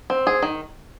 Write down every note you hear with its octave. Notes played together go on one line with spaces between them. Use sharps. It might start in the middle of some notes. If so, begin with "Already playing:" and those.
C4
G#4
D#3